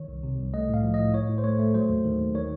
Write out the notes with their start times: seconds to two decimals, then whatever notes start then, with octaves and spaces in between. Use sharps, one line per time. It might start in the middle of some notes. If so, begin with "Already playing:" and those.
Already playing: D#3 C#5
0.08 C2
0.23 C3
0.38 C2
0.54 A3 D#5
0.69 A2 F5
0.84 F3
0.94 A2 D#5
1.13 A2 C#5
1.29 A2
1.38 C5
1.44 A3 C#5
1.59 A3
1.74 F#3 C5
1.89 D#2
2.05 D#3
2.19 D#2
2.34 D#3 C#5